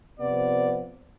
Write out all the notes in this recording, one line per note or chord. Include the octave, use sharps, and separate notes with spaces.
C3 F3 B3 D5